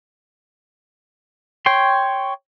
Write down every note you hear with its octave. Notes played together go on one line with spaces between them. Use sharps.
C#5 G5 C6